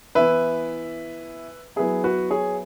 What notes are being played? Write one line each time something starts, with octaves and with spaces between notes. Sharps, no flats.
E3 B3 E4 B4 E5
F#3 B3 E4 G#4
F#4 B4
G#4 C#5